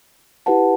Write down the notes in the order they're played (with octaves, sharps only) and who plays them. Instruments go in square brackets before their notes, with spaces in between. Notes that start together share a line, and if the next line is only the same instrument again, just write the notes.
[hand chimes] E4 G4 B4 F#5 A5